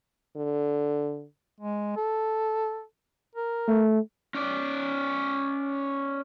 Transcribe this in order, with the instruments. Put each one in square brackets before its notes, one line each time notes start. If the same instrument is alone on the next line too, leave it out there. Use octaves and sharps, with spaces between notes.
[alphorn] D3
[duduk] G#3
A4
A#4
[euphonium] A3
[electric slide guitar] C#4 D5